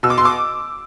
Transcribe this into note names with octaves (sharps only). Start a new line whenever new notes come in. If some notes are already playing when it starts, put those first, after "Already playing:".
B2 E6
D6
C6
D6